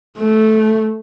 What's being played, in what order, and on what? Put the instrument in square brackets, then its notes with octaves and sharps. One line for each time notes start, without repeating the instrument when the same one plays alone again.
[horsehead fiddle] A3